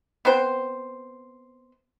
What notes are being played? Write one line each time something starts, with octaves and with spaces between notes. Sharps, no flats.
B3 C4 C5